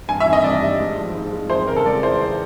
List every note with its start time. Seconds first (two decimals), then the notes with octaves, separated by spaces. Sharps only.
0.08 G2 G#5
0.20 E5
0.26 D#3
0.33 D#5
0.44 G2 D5
0.62 G3
0.79 G#2
0.97 F3
1.15 G#2
1.32 G#3
1.49 F2 C5
1.67 C#3 A#4
1.76 A4
1.85 G#3 D5
2.03 E3 C5